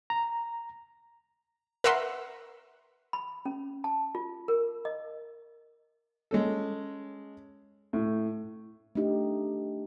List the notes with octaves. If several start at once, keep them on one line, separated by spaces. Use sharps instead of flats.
A#5
A#4 B4 E5 F#5 C6
B5
C#4
A5
F4
A#4
D#5
G#3 C#4 A4
A2
A3 D4 D#4 G4